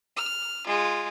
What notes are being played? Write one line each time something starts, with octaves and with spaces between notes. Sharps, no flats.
F6
G#3 F4